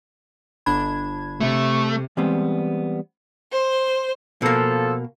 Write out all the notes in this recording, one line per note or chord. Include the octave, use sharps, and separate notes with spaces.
G1 D4 B5 G#6
C3 A3
E3 G3 G#3 B3 C4
C5
B2 F3 A#3 A4